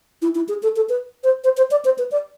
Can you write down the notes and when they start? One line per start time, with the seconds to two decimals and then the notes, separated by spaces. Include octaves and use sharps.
0.22 E4
0.35 E4
0.48 G#4
0.63 A4
0.76 A4
0.89 B4
1.24 C5
1.44 C5
1.57 C5
1.71 D5
1.85 C5
1.98 B4
2.11 D5